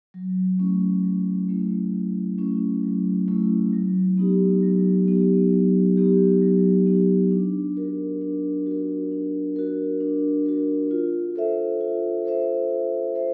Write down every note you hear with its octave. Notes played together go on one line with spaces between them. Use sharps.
F#3
A3 C#4 E4
F#3
A3 C#4 E4
F#3
A3 C#4 E4
F#3
A3 C#4 E4
F#3
B3 D#4 G4
F#3
B3 D#4 G4
F#3
B3 D#4 G4
F#3
B3 D#4 G4
D4
F#4 A#4
D4
F#4 A#4
D4
F#4 A#4
D4
F#4 A#4
F4
A4 C5 E5
F4
A4 C5 E5
F4
A4 C5 E5